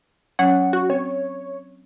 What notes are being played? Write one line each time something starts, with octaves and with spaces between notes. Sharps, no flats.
F#3 C#4 F#5
F#4
C4 C#5